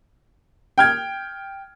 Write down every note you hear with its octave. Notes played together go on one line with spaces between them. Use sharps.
G5 F6 G#6